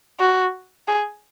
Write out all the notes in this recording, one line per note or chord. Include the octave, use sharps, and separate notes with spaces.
F#4
G#4